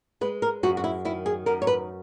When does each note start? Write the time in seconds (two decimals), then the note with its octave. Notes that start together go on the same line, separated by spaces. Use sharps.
0.21 G#3 B4
0.42 A#4
0.63 F#2 F#4
0.77 F#4
0.84 E4
1.05 D#3 E4
1.26 G#4
1.46 F#2 A#4
1.62 C#5
1.67 B4